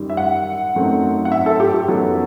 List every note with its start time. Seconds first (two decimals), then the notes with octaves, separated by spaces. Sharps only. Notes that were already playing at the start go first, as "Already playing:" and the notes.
Already playing: F#2 D#3 G3 D#4
0.10 E5
0.17 F#5
0.75 F#2 F#3 A3 C4 D#4
1.25 F#5
1.32 E5
1.46 A4
1.60 G4
1.74 G4
1.88 F#2 F#3 B3 D#4 A4